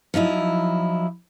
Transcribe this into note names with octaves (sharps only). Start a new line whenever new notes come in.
F3 F#3 D#4 E4